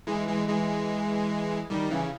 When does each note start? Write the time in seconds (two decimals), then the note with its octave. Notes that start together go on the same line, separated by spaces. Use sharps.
0.07 E3 G#3
0.28 E3 G#3
0.48 E3 G#3
1.70 D#3 G3
1.90 C#3 E3